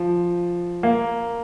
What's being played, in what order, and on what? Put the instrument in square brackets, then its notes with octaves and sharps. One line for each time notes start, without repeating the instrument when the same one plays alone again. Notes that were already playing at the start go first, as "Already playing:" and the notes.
Already playing: [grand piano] F3
A#3